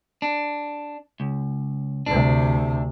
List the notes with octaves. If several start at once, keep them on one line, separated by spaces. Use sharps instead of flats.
D4
C#2
D2 C3 D4